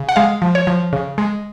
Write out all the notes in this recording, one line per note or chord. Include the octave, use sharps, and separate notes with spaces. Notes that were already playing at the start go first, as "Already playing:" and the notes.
Already playing: C#3
F#5
G#3 F5
F3
C#5
F3
C#3
G#3